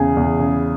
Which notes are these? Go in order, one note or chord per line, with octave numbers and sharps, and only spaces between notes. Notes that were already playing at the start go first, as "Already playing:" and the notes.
Already playing: E2 C#3 G#4
E2
C#3